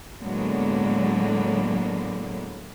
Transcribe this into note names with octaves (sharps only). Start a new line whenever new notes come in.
A2 D3 F#3 G#3 A#3 B3